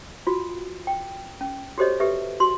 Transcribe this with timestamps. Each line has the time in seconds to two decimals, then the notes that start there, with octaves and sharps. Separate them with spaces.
0.27 F4 F#4
0.87 G5
1.41 C#4
1.78 F#4 G4 A4 C5 C#5 D#5
2.00 G4 A4 B4 E5
2.40 F#4 C6